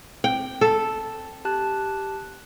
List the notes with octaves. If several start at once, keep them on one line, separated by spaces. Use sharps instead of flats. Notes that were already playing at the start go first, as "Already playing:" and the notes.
C4 G5
A4
G4 A5 F#6